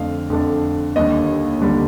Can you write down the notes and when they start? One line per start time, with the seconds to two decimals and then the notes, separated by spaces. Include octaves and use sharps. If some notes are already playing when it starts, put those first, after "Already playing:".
Already playing: F2 D3 A3 D4 F5
0.30 F2 D3 A3 D4
0.96 D#2 D3 G3 D4 D#5
1.62 D#2 D3 G3 D4